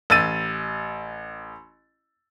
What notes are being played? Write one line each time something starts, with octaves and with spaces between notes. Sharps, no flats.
A1 E6 A6 D#7